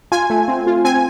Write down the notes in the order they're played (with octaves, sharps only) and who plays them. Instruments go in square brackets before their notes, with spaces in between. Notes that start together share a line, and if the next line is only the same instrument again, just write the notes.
[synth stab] F4 G#5
A3
C4
F4
C4 G#5